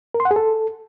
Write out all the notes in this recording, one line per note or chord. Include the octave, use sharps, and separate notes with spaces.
A#4
C6
F#5
G#4
A4